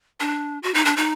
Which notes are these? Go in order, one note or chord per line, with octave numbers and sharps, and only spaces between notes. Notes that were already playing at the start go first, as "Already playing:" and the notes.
D4
F#4
D#4
D4
D#4